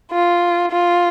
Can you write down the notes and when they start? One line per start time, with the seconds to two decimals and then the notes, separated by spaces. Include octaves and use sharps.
0.12 F4
0.72 F4